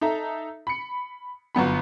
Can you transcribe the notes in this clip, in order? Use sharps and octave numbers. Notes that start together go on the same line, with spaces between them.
D#4 A4 E5 A#5
B5 C#7
G1 F#2 B3 B5